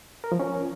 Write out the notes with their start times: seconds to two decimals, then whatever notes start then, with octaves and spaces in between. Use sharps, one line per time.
0.24 A#4
0.32 F3
0.40 C#4